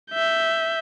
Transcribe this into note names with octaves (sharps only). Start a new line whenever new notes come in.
E5 G6